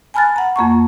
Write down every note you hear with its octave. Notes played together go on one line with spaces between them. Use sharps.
G#5 A5 B5 F6 F#6 A6
F#5 A#5
F2 A#3 A5 C#6